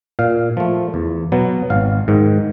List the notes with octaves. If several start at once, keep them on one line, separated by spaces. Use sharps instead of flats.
A#2 F5
F3 A3
E2
B2 F#3 B3
G#1 F5
G#2 D#3